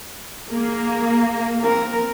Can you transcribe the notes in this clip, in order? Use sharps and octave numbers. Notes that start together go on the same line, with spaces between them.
A#3 G#4
C4 A#4